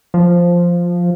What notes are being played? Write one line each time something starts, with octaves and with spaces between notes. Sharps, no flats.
F3